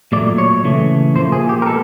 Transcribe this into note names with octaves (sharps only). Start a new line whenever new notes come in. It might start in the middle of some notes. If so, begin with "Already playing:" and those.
A#2 F#3 A3 D5
C#5
C#3 E3 A3
A#2 F3 A#3 C5
G#4
G4
A#4
G#3 B3 A4